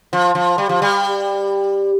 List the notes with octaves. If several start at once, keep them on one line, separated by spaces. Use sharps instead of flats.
F3
F3
G3
F3
G3